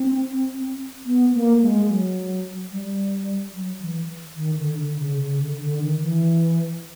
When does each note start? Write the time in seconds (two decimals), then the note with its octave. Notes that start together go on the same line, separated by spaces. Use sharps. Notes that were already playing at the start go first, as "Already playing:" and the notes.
Already playing: C4
1.06 B3
1.34 A#3
1.62 G#3
1.89 F#3
2.71 G3
3.53 F#3
3.81 E3
4.36 D#3
4.56 D3
4.77 D3
4.99 C#3
5.19 C#3
5.39 D3
5.60 D3
5.81 D#3
6.02 E3